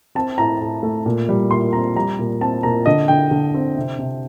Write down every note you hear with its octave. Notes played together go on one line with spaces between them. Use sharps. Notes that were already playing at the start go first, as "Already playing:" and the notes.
C4 A5
A2 A#5
A2
A3
A#2
G3
A#2 C6
C4 A#5
G3 A#5
A#2
C4 A5
A#2 A#5
D3 D#5
D3 G5
D3
C4
C3
C3